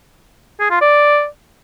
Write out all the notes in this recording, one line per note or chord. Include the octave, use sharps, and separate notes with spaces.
G#4
F4
D5